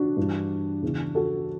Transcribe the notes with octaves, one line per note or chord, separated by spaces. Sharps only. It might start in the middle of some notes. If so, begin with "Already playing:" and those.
Already playing: D4 F#4
G2 E3
E2 C#3 E3
F#4 A4